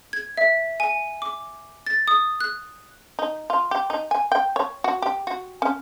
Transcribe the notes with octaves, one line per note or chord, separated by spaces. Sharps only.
G#6
E5
G#5
D6
A6
D#6
F#6
D#4
F4
G4
D#4
G#5
G5
C#5
F#4
G4
F#4
C#4